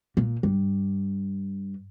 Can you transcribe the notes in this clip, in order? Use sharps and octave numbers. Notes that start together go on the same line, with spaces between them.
A#2
G2